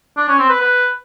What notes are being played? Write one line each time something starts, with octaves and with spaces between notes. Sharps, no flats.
D4
C#4
C4
B4
B4